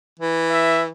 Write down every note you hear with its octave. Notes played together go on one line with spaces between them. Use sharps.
E3
E5